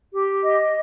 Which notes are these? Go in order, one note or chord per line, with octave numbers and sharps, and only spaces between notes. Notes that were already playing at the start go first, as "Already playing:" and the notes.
G4
D#5